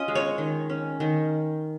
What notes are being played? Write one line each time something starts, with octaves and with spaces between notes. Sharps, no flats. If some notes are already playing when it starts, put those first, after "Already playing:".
Already playing: C#4 F4 D#5
G#3
C#5
D#3
C#4
D#3